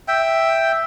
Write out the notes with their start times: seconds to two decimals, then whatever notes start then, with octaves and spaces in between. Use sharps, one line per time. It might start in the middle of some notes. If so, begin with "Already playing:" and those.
0.08 E5 G5